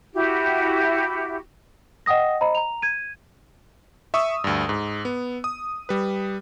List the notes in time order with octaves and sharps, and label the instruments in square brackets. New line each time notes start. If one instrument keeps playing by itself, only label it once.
[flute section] E4 F#4 G4
[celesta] D#5 F#5 G5 D#6 A#6
C5 D#5 A#5 B5
A#5 F7
G#6 D#7
[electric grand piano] E5 C#6 D#6 E6
D2 G2
G#2
B3
D#6
G3 B4